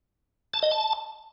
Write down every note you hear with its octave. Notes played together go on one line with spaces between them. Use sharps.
A5
D#5
A5